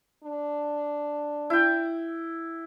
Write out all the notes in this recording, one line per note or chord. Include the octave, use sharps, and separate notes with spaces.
D4
E4 G5